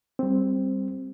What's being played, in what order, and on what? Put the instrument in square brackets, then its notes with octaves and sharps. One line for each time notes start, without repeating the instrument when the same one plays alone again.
[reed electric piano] G3 C4